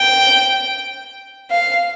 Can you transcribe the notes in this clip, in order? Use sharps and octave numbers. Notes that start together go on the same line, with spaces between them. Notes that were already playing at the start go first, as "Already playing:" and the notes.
Already playing: G5
F5